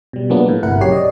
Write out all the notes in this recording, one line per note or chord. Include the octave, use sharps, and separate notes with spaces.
B2 G3
F3 F#3 G#3 A#3 B3 D4
A2
G1 C3 E4 A#4 F#5
B1 C#3 F#3 G4 C#5 C7
D5 D#5